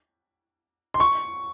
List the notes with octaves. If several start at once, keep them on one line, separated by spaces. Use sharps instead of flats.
C6
C#6